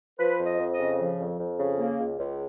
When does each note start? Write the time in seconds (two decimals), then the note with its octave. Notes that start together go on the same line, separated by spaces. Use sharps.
0.19 F3 B4
0.39 F2
0.46 D#5
0.59 F2
0.73 D#5
0.79 C#3
0.99 F3
1.19 F2
1.39 F2
1.59 C#3
1.79 A#3
1.99 C#2
2.19 C#2